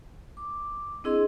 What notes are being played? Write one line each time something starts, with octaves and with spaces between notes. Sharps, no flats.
D6
C4 D4 E4 G#4 D#5 C6